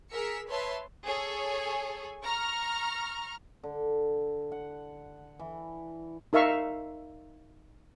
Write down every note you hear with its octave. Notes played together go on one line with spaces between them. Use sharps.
G#4 A#4 E6 B6 C#7
B4 C#5 E5 A5 C6
G#4 A4 C#5 G#5
A#5 C#6 F6
D3
F#5
E3
D#4 A#4 E5 F5 C#6